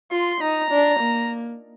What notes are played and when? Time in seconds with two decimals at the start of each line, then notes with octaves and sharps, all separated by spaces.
0.11 F4 C6
0.41 D#4 A#5
0.71 D4
1.00 A#3